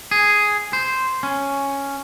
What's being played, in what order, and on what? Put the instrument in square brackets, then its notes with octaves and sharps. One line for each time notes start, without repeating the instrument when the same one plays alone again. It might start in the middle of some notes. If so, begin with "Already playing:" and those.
[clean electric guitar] G#4
C5
C#4